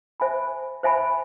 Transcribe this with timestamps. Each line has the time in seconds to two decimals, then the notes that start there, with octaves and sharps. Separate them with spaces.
0.20 C5 E5 G#5 B5
0.83 C5 E5 G#5 B5